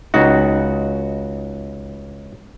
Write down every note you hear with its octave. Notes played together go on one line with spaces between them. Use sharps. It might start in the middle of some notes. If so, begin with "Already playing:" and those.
C#2 D#4 F#4